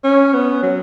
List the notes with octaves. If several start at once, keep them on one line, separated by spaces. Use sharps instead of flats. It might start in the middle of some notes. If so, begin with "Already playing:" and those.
C#4
B3
F#3